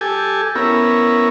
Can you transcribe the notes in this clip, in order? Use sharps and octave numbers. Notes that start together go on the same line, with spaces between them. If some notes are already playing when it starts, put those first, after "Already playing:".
G4 A4 G#5
B3 C#4 E4 A#4